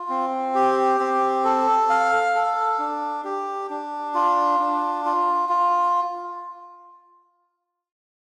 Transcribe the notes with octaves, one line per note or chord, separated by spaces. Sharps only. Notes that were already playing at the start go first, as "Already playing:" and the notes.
Already playing: F4
C4
G4
C4
A4
F5
A4
D4
G4
D4
F4
D4
F4
F4